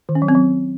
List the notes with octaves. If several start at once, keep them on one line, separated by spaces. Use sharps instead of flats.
D#3
C#4
F#3
C4
F#3